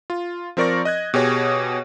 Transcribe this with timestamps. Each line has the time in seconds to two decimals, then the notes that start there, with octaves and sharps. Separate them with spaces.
0.10 F4
0.57 F3 C4 A#4 D5 C#6 A#6
0.85 D#5 F#6 G#6
1.14 B2 G4 G#4 C#5